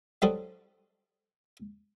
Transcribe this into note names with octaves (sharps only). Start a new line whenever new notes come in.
F#3 G3 C4 D#4 F#4 A4